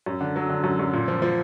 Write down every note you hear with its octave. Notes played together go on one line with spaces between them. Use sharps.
F#2
D3
F#3
D3
F#2
F#2
A#2
F3
F3